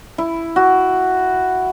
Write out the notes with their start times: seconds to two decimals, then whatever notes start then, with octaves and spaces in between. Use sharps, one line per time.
0.18 E4
0.56 F#4